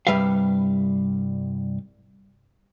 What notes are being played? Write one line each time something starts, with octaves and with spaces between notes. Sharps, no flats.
C2 G2 G3 B4 E5 F5